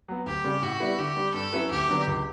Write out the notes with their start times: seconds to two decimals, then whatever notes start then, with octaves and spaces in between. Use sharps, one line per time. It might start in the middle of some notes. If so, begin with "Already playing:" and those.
0.08 F#3 B3
0.26 D2 G4
0.44 C#3 G3
0.62 A2 F#4
0.80 G3 B3 E4 B4
0.98 D3 G4
1.16 G3 D4
1.34 G2 A4
1.53 F#3 C#4 E4 B4
1.70 D2 G4
1.89 D3 F#3 B3 D4
2.07 C#2